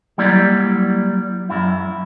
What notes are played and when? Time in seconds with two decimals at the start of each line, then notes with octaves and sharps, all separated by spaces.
0.18 F#3 G3 A#3 E4 D5
1.49 F#2 E4